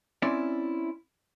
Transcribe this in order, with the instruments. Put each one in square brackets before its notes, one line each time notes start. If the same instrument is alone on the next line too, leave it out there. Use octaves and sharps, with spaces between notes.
[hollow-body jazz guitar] C4 C#4 E4 D5